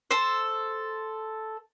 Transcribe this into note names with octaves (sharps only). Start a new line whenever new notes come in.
A4 C5